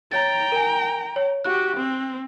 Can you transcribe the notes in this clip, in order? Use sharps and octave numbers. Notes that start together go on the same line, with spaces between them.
C#5 G5 A#5 A6
A#4 G#5
C#5
F#4 G4 F#6
C4